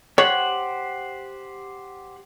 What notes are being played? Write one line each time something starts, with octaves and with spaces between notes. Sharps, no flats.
G4 C5 C#5 F#5